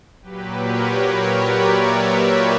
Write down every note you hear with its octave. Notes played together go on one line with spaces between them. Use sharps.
A#2 F#3 G4 B4
A#4 C#5
A#4 C#5
B4 D5
C#5 E5